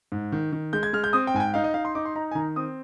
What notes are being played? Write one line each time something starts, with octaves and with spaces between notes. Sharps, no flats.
G#2
D#3
D#3
G#3 G6
G#6
G#3 F6
G6
C4 D#6
G5
G#2 G#5
G5
D#4 F5
D#5
D#4 F5
C6
D#4 D6
C6
D#4 A#5
G#5
D#3 A#5
C4 D#6